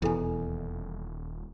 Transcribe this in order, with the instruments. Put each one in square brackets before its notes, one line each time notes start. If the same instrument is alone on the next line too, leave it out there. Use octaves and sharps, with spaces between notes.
[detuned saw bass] D#1 [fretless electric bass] E2 B2 [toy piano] E4 A4 G#5